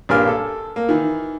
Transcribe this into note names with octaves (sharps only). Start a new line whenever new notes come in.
A#1 G2 A#3 G4 G#5 F6
A4
A#3
D#3 E3